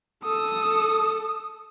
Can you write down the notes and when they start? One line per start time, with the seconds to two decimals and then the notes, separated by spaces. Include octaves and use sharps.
0.24 A4 D#6